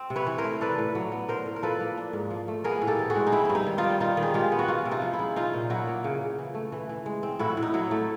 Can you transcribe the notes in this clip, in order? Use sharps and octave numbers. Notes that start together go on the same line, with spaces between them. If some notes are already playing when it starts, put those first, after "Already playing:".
Already playing: C4
C3
B4 C#5
E3
A#4 C5
A3
D4 A4 B4
A2
F#3
B3
D4 A#4 C5
A2
A#4
F3 A4 B4
A#3
D4
G#2
F3
A3
B3 G#4 A#4
A2
G4 A4
E3
F#4 G#4
G#3
D#4
C4 E4
G2 E4
D#4
D#3
D#4 F4
G3
D#3 D#4 F4
D#3
G#4
G#3 F4 G4
B3
F#4
C#4 D#4 F4
C3
D#4 F4
F3
E4
G#3
C#4 D#4 F4
A#2
F#3 E4 F#4
A#3
C#3
C#3
E3
A3
E3
E3
G#3
C4
A2 E4 F#4
A2
D#4
F#3 E4
A3